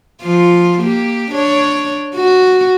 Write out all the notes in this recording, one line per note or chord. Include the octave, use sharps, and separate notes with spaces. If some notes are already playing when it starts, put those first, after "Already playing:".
F3 F4
A#3 G4
D4 C#5
F#4